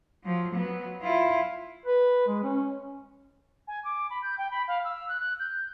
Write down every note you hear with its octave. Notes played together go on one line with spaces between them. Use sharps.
F3 F#3
F#3 B3
E4 F4
B4
G#3
C#4
G#5
D6
B5
G6
G5
B5
F5
E6
F#6
F#6
G6